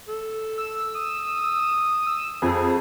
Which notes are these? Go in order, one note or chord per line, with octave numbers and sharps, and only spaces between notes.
A4
E6
D#6
E6
F2 G#4